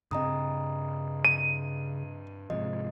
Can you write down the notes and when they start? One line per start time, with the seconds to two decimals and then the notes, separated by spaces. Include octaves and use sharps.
0.11 G2 C#3 C4 D#5 A#5 D#6
1.25 D#7
2.50 G#2 C3 F3 D#5